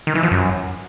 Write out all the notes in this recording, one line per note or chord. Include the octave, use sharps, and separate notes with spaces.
D#3
E3
F3
F#2